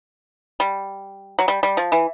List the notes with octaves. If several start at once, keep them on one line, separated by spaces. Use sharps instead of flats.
G3
F#3
G3
G3
F3
E3